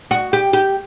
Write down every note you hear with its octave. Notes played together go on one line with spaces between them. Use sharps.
F#4
G4
G4